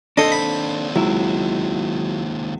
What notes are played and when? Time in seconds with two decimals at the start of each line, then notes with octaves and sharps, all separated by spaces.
0.17 D#2 C4 D4 A4 D#5 C6 D#6
0.32 B5
0.96 C#2 F#3 E4